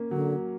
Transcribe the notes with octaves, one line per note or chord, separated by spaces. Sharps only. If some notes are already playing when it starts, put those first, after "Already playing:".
Already playing: A#3 C#4
D3 F#3